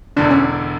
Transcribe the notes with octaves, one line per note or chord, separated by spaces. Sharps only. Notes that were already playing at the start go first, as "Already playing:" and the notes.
E1 E2 D3 D4
C#4